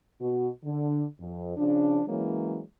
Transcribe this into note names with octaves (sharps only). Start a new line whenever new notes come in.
B2 F#4
D3
F2
C#3 F3 D4
E3 F#3 G#3 A#3 C#4